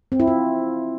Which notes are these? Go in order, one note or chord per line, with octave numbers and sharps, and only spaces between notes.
C4
E4
F4